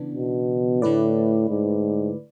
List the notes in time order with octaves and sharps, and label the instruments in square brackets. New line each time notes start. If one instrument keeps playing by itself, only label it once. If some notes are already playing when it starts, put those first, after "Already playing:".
Already playing: [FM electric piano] C#3 E3 B3 D4
[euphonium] B2
[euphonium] A2 [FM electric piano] D3 A3 E4 B4 D5
[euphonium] G#2